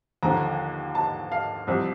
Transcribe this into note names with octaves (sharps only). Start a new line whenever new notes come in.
D#2 D3 F3 A#5
A5
F5
C2 C3 F3